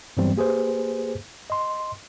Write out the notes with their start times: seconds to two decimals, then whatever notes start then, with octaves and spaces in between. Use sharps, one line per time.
0.17 G2 E3 F#3 G3 B3 C4
0.36 A#3 G4 G#4 B4 C5
1.50 D#5 C6